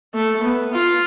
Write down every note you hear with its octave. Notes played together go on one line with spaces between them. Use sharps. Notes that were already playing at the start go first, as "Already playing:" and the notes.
A3
B3
F4